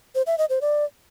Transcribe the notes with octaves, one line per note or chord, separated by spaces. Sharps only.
C5
E5
D#5
C5
D5